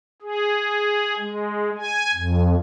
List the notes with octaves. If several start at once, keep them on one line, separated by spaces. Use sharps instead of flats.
G#4
G#3
G#5
F2